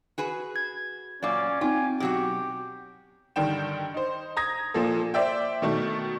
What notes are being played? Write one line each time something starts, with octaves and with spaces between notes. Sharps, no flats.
F#4 G#4 B4
G#6
F#2 A#2 C#4 D5 F5 D6
C4 D#4 F4 G5 G#5
B2 F#3 F#4 G4
G2 D3 D#3 G3 G5 E7
D#4 C5
A#5 D#6 G#6 A#6
A#2 F3 A#3 A4
C5 D5 E5 G5
B2 D#3 A3